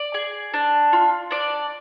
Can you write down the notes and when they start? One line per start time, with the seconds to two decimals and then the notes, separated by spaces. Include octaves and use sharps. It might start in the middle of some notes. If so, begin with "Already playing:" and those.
Already playing: D5
0.14 G#4
0.54 D4
0.93 F4
1.31 D4 D5